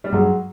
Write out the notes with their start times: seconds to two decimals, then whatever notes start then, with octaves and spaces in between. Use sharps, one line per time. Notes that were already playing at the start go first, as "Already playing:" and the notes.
0.04 G3
0.12 G2 F#3 G#3